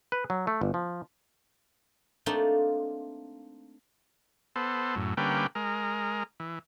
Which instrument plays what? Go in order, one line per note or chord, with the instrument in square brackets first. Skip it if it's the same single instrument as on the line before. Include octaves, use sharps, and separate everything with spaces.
[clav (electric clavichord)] B4
F#3
A3
G1
F3
[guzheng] A3 A#3 C4 D4 D#4 F4
[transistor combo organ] B3 A4 C5
F#2 A2
D3 G3 A#3 C#4 B4 G5
G#3 A#4
E3